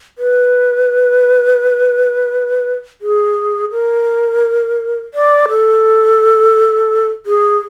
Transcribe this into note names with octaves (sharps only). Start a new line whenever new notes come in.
B4
G#4
A#4
D5
A4
G#4